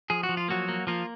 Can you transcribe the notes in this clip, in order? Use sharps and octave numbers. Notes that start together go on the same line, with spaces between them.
F3 G#4
F#4
F3
F4
F#3 A#3 F#4
A#3
F3 A#3 F4